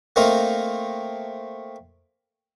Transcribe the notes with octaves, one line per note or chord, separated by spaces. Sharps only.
A3 A#3 C4 D#4 A#4